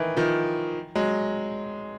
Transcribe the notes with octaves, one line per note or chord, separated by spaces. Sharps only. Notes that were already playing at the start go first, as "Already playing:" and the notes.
Already playing: D#3 E3
D#3 F3
F#3 G#3